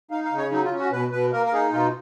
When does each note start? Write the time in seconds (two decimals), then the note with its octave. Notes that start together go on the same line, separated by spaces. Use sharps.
0.11 D#4 F5
0.25 F5
0.32 C#3
0.38 C#5
0.51 F#3 D#4
0.65 F4
0.72 C#4
0.79 F#4
0.92 B2 B4
1.12 B2 B4
1.32 A#3 A#4
1.46 A#4
1.53 D#4 G#4
1.72 B2 F4